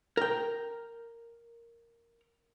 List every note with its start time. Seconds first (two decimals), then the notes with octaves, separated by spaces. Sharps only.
0.17 A#4 G5